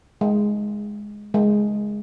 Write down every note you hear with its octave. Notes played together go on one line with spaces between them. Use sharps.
G#3
G#3